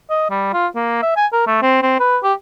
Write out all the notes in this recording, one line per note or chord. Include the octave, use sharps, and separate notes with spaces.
D#5
G3
F4
A#3
E5
G#5
A#4
A3
C4
C4
B4
G4